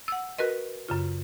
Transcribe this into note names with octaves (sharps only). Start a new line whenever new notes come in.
F#5 E6
F#4 A#4 B4 D#5
F#2 C#3 F4